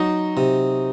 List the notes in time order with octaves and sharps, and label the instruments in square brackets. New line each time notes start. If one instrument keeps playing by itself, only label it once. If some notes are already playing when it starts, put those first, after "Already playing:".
Already playing: [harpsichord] F#3 [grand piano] D#4
[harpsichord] C3